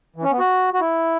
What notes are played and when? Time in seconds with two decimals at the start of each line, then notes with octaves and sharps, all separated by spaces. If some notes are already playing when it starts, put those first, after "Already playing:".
0.16 E3
0.23 C#4
0.31 B3
0.39 F#4
0.74 F#4
0.80 E4